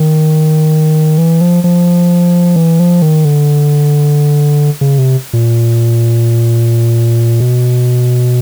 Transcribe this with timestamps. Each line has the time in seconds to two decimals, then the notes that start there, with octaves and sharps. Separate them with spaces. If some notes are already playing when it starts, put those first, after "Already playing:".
Already playing: D#3
1.18 E3
1.41 F3
1.64 F3
2.56 E3
2.80 F3
3.02 D#3
3.25 D3
4.81 C#3
4.98 C3
5.33 A#2
7.40 B2